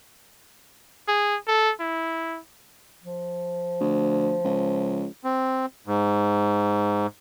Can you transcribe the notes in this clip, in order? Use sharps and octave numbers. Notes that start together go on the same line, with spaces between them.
G#4
A4
E4
F3
D2
C#2
C4
G#2